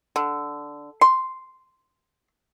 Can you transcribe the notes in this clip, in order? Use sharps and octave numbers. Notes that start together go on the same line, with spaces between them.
D3
C6